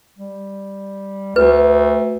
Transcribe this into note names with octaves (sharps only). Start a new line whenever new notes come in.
G3
D2 B4